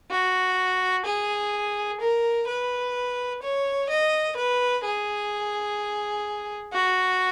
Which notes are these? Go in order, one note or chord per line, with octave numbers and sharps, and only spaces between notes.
F#4
G#4
A#4
B4
C#5
D#5
B4
G#4
F#4